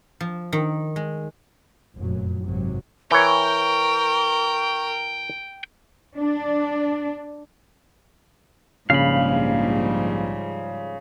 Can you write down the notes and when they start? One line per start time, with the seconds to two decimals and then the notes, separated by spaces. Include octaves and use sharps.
0.20 F3
0.52 D#3
0.96 G#3
1.95 F1 F#2 A#2 F#3
2.43 G#1 C3 F#3
3.11 E3 A#4 C#5 G5 C#6
6.16 D4
8.90 A#1 G#2 C#3 F3 G3 F5 B5